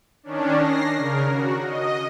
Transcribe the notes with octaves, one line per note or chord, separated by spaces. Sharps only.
D#3 C#4 D4
A#6 C7
C#3 A#4
F#4
D#5